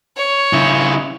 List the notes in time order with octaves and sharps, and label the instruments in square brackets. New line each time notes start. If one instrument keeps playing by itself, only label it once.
[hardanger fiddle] C#5
[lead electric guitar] C#3 E4